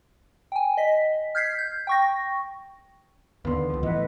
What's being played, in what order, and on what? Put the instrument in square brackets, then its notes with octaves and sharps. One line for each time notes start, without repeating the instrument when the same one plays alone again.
[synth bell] G5 G#5
D#5 B6
F6 G6 G#6 B6 C7
G6
G5 C#6 A#6
[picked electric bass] D#2 D3 [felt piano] B3 C6
[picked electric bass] C#2 F3
[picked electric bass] A2 [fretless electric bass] E3 [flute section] B4 D#5 F#5